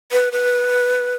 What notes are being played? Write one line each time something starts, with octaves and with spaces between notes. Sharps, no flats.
B4
B4